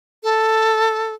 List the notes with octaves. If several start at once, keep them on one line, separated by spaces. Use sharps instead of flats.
A4